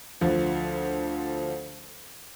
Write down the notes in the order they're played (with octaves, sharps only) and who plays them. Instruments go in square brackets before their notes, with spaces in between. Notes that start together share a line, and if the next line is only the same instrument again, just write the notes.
[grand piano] D2 F3